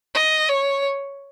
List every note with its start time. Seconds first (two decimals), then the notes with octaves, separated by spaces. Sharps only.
0.15 D#5
0.49 C#5